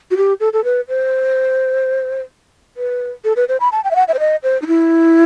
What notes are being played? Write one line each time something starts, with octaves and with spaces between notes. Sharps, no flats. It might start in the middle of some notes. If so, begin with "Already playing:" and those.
F#4
G4
A4
A4
B4
C5
B4
A4
B4
C5
B5
A5
G5
E5
F#5
E5
C5
D#5
C5
D#4
E4